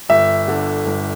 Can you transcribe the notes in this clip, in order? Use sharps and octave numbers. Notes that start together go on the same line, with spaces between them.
G1 E5
D3
G1